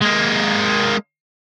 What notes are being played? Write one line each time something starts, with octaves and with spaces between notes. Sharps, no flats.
G#3 A#3